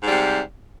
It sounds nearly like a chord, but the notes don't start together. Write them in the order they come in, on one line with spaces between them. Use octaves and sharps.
G#2 G3 C3